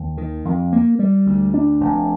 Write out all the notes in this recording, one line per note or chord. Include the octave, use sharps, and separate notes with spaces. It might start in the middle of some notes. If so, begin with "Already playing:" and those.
Already playing: D#2
D#3
F2
A#3
G3
D2
D4
F1